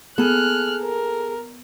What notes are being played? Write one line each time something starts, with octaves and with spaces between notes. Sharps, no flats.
B3 G#4 A4 F6 F#6
A#4